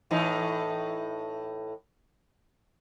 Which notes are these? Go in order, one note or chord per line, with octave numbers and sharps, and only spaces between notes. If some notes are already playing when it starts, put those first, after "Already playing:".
A2 E3 D#4